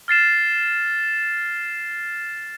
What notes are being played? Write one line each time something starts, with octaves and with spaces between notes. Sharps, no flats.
F6 A6 C7 E7